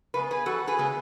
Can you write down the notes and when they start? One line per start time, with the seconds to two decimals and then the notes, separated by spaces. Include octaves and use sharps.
0.14 C#3 G#3 B3 B4
0.31 G#4 B4
0.46 F2 F#4 A4
0.67 G#4 B4
0.78 C#3 G#3 B3